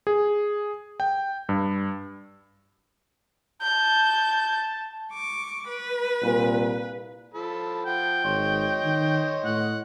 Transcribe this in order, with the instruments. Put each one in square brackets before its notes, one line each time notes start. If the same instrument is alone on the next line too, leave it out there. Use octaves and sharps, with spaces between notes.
[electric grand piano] G#4
G5
G2
[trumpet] A5 [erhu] G6
[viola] C#6 D6
B4
[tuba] C2 [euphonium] A#2
[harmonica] F3 A4 B5
[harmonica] F3 F#5 [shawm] G5
[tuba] G#1 [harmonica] C#5 D#5 C6
[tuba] D#3
[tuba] A2 [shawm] F#5